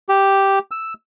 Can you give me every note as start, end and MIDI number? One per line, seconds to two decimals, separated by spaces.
0.09 0.59 67
0.71 0.94 88